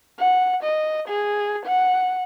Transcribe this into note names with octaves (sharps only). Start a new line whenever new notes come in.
F#5
D#5
G#4
F#5